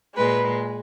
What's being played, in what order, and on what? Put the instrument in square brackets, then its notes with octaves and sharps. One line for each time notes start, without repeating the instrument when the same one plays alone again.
[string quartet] A#2 G#3 B4